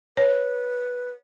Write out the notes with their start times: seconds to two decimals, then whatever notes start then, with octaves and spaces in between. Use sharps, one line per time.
0.17 B4 C#5